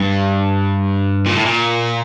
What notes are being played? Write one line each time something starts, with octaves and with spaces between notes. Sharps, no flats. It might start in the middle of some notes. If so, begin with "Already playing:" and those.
Already playing: G2
A#2
A2
A#2